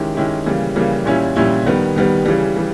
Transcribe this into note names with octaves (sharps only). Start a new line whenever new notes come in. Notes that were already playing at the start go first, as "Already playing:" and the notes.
Already playing: D#3 G#3 C#4 E4 G4
D#3 G#3 C#4 E4 G4
C#3 E3 G3 A#3
C#3 E3 G3 A#3
A#2 G3 C#4 E4
A#2 G3 C#4 E4
D#3 G3 B3
D#3 G3 B3
C#3 E3 G3
E3 G3